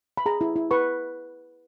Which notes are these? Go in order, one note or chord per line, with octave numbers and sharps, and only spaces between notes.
B5
G#4 A#5
E4
E4
B4 C#6